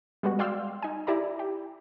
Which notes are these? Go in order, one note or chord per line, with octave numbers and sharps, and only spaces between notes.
G3 G#3 B3 F#4
D5 F5 G5 C6 E6 F6
D#4 G#5
E4 G4 D5 A#5
G4